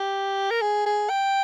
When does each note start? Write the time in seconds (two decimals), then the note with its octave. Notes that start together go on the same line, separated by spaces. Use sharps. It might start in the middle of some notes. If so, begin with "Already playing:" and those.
Already playing: G4
0.51 A#4
0.62 G#4
0.86 G#4
1.10 G5